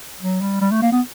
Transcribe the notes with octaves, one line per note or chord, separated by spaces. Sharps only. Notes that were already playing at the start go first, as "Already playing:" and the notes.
F#3
G3
G3
A3
A#3
B3